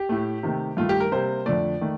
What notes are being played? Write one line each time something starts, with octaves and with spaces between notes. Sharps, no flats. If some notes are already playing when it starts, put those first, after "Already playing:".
Already playing: G4
A2 A3
C3 D#3 A3
G2 D#3 A3 F4
G4
A#4
C3 G3 A#3 C5
F2 D3 F3 A3 D5
D#3 A3